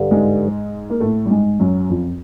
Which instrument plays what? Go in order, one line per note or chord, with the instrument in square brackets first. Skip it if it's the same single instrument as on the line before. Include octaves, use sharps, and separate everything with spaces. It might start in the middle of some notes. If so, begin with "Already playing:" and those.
Already playing: [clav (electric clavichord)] G2 D3 G3
[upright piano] G#2 G#3
A#3
A2 A3
G3
G#2 G#3
F#2 F#3
F2 F3